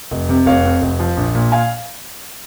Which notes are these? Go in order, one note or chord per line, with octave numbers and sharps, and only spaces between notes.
F1
C3
F1 C#5 F5
F2
F1
F3
A#1
A#2
F5 G#5